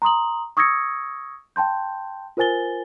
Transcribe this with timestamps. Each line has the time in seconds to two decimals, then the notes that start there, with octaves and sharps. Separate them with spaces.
0.02 A#5 C6 D#6 F#7
0.57 C#6 D#6 E6 G#6 A#6 C#7
1.56 G5 A5 C6 G6
2.37 F4 A#4 C5 G#5 A6 G7